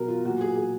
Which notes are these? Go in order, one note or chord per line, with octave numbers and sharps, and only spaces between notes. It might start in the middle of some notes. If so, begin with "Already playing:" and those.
Already playing: B2 F#3 A#4
F4
A#2 F#3 F#4
G#4
G#4